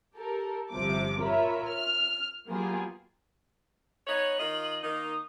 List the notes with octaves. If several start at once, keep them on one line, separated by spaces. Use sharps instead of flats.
G4 A4 A#4
G1 C3 F3 D6
F4 A#4 C#5 E5 B5
F6
F#3 A#3 B3 F4 G4 G#4
B3 D#4 C#5 F#7
D#3 F4 D#5
D#3 A#3 D#4 D#6